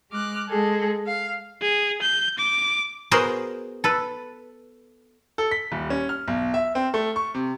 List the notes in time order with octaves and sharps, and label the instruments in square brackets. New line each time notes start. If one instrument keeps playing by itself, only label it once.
[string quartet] G#3 D6 F6 F#6
G#3 G#4 A4
F5
[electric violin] G#4
G6
D6
[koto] B3 F#4 G#4 A#4 C5
A4 B4
[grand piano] A4
B6
D#1
C#4
F6
B1
E5
C4
A3
C#6
C3